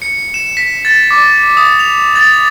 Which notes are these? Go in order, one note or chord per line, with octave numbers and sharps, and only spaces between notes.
C#7
E7
B6
A6
D6
D#6
F7
A6